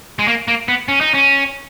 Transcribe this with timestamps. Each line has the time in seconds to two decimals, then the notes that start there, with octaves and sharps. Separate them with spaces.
0.19 G#3
0.28 A#3
0.48 A#3
0.68 B3
0.88 C#4
1.01 D#4
1.14 C#4